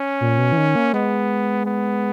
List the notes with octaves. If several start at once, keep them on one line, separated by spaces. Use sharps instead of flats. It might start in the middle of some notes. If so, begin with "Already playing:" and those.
Already playing: C#4
A#2
B2
E3
D#3
A#3
G#3 B3
B3